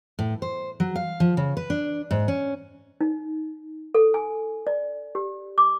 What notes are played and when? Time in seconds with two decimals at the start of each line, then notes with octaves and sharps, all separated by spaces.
0.19 A2
0.42 C5
0.80 F#3
0.96 F5
1.20 F3
1.37 C#3
1.57 B4
1.70 D4
2.11 G#2
2.28 C#4
3.01 D#4
3.95 A4
4.14 G#5
4.67 D5
5.15 G4
5.58 D6